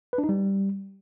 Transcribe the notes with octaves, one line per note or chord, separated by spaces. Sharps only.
B4
D4
D#4
G3